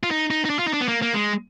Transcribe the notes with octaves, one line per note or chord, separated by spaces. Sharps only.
F4
D#4
D#4
D#4
D4
F4
D#4
D4
B3
A#3
A#3
G#3